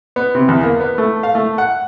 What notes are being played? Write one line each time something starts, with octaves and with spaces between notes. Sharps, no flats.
B3
C3
E2
A#3
B3
A3
F5
A3
F#5